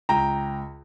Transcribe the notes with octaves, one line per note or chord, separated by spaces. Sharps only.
C#2 G5 A#5